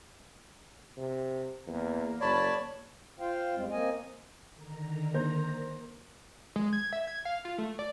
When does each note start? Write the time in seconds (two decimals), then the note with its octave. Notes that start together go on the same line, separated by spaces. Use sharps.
0.97 C3
1.67 E2 A#3
2.21 F#1 C#5 D5 A5 B5
3.20 F4 C5 F5 G5
3.55 F#2 G3 G#3 C4
3.71 A#3 C4 D#5 G#5
4.52 D3 D#3 A#5
5.14 A#3 C5 G6
6.56 G#3
6.73 G#6
6.93 E5
7.07 G#6
7.25 F5
7.45 F4
7.58 A3
7.79 D5